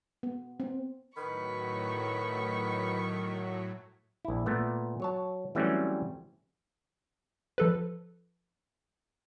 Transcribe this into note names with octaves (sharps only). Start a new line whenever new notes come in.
B3
C4
A2 D#3 F#3 B4 C#6 B6
A#1 E4
A#2 A3 B3
F#3 C#5 A5
E3 F#3 G3 A3 C4 C#4
F3 A4 B4